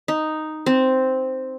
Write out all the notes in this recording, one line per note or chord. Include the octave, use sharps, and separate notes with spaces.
D#4
C4